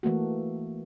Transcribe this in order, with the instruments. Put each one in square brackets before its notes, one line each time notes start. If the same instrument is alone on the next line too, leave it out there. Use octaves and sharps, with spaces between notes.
[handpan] E3 A3 A#3 F#4